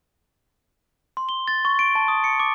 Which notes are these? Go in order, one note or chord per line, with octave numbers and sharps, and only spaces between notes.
C6
G7
A6
C#6
D7
A5
D#6
C#7
D6